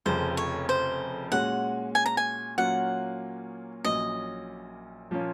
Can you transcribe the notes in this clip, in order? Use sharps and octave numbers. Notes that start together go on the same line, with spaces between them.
F1 F2 C#3 F3 C5
C#5
C5
A#2 G#3 C#4 F#4 F#5
G#5
A#5
G#5
A#2 F#3 A#3 C#4 F4 F#5
A#1 A#2 F#3 C#4 D#5
A#2 F3 A#3 C#4 F4